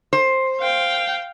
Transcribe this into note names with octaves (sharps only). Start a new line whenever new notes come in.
C5
F5 G5